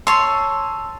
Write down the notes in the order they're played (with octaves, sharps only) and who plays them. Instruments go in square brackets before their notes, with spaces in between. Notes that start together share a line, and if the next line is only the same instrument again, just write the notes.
[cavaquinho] C#5 C6 [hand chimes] A5 E6